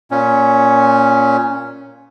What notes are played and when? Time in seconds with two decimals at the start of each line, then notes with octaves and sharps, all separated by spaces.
0.11 A#2 C#4